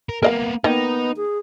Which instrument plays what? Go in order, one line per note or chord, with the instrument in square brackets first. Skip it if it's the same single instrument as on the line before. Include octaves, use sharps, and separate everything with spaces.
[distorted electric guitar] A#4
[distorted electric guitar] A#3 B3 [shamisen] A#4 D#5 F5
[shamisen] D#3 A#3 D#5 [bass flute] B3 [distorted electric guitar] D#4
[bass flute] G#4